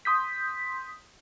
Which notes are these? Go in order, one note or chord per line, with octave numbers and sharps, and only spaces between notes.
C6 D#6 G6 B6